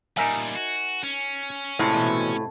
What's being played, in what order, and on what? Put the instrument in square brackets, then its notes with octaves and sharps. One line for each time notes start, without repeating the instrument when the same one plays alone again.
[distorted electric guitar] A#2 G3 [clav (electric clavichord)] D#4 A#4 E5 [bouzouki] G#5
[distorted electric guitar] F#4
C#4
[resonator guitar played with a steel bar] A2 [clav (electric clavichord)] C3 G#3 F4
[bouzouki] B2 E3 E5